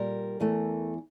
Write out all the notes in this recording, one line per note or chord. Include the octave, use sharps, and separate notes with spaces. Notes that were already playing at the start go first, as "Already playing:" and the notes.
Already playing: A#2 G3 A#4
E2 E3 A3